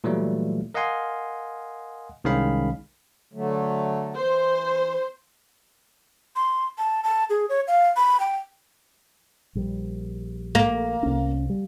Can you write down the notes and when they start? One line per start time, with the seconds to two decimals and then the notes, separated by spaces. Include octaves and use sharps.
0.04 A#2 E3 F#3 G3 A3
0.74 A#4 D#5 F5 F#5 G#5 C6
2.24 C2 D#3 G#3 C#4 F5 B5
3.34 D3 F#3 A3
4.15 E3 C5
6.36 C6
6.78 A5
7.04 A5
7.30 G#4
7.49 C#5
7.68 F5
7.96 B5
8.20 G5
9.55 A#1 G3
10.55 A#3
11.03 C2 C#4
11.50 G3